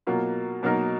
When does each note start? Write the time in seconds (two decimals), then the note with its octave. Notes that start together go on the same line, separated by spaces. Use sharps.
0.07 B2 F#3 A#3 F4
0.63 B2 F#3 A#3 D#4 A#4